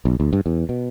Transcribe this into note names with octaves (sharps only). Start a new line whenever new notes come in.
B1
D2
G2
E2
B2